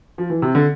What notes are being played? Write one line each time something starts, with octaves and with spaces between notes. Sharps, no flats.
F3
E3
C3
D3